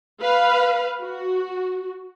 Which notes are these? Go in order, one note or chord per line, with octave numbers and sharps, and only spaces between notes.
B4 F5
F#4